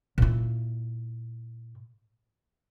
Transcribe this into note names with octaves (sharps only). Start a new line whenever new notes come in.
A#2 E4